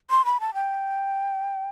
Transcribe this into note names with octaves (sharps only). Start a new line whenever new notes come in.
C6
B5
A5
G5